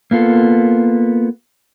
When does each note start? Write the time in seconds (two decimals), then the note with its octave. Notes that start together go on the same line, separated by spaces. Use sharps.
0.11 A#3 B3 F4 A4